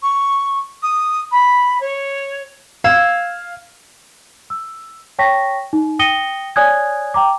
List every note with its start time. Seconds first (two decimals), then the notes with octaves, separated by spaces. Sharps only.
0.02 C#6
0.82 D#6
1.31 B5
1.80 C#5
2.84 F5 E6 G#6
4.50 E6
5.19 C#5 G5 A5 C#6 A#6 B6
5.73 D#4
5.99 G5 D#6 A#6 C#7 D#7 G7
6.56 C#5 D5 G#5 D#6 F#6 G#6
7.14 G5 A#5 D6